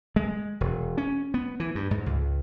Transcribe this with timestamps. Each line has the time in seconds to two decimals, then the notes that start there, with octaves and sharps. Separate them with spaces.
0.16 G#3
0.61 E1
0.98 C#4
1.34 B3
1.60 E3
1.75 G2
1.91 G#2
2.06 C#2